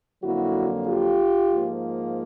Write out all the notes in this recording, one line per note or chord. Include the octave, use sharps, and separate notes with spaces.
F2 D3 F#3 A#3 E4 F#4
F4 G4
G#2 F3 A#3